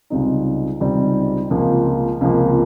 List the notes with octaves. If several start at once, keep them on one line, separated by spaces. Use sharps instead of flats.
C#2 C3 G3 C4 D#4
C#2 C3 G3 C4 D#4
C#2 C3 F3 A#3
C#2 C3 F3 A#3